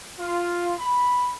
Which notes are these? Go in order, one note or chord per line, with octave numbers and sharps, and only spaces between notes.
F4
B5